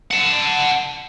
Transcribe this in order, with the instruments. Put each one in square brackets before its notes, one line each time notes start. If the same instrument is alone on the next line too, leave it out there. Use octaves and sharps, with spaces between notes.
[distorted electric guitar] F#5 A5